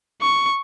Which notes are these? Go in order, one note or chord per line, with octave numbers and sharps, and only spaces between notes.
C#6